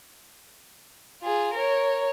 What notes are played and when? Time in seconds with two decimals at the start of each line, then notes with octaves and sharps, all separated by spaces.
1.22 F4 G#4
1.54 A#4 C#5